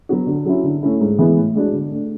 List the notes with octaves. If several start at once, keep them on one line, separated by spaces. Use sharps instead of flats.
F#3 B3 F#4
D3
F#3 C#4 E4
D3
A3 C#4 E4
G#2
E3 G#3 B3 E4
A2
G#3 D4 F#4
D3
A3 D4